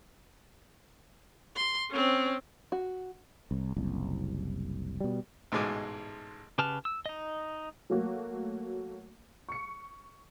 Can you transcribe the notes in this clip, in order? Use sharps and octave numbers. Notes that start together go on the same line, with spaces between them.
C6
C4 C#4
F#4
C2
F#1 C2
B2 G3
A1 G#2 B2 G#3 G#5 D6
C#3 G4 B4 A5 F6
E6
D#4 D#5
F#3 A3 A#3 F#4
C#6 C#7